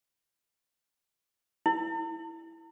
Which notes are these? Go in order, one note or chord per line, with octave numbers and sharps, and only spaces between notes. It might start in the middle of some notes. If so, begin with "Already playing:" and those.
E4